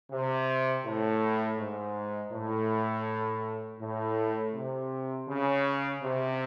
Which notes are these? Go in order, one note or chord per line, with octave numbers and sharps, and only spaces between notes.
C3
A2
G#2
A2
A2
C3
C#3
C3